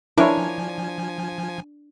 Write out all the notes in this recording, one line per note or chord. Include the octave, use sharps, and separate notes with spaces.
F3 D4 E4 A#4 C#5 G#5